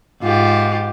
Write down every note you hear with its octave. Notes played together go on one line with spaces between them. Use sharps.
G#2 F4 G4